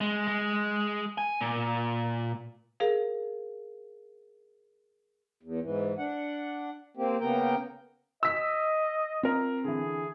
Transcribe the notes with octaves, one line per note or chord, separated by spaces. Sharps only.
G#3
G#3
G#5
A#2
G#4 A#4 F5
E2
G#2 E3
D4 F#5
A#3 C4 G4
C#3 A#3 B3 A#4 G5
D#5 E6 B6
C4 F4 A#4
D3 E3 G#4